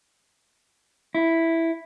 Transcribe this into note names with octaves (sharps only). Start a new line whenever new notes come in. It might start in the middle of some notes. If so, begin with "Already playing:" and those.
E4